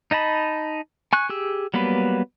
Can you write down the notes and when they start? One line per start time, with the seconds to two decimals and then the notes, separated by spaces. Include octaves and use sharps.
0.11 D#4 D#5 A5 B5
1.13 G#5 C#6 F#6
1.29 G4 G#4 E6
1.74 F#3 G3 A#3 B3 B4